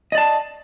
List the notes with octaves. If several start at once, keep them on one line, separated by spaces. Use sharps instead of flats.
D5 D#5 A5